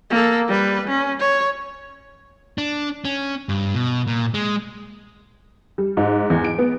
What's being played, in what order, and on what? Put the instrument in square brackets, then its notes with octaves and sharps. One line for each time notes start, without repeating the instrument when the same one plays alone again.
[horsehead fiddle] A#3 A4
G3 B4
C#4
C#5
[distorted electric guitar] D4
C#4
G2
B2
A#2
G#3
[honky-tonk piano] G3
G#2
E2
D7
B3